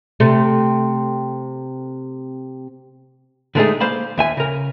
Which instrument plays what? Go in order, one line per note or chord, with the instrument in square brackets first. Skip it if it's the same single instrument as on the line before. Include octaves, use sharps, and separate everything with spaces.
[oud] C3 A3
[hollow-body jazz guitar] D3 G#3 A3 C#4 D#4 G#4
A#3 C5 F5 B5
D#2 E5 G#5
C#3 A#4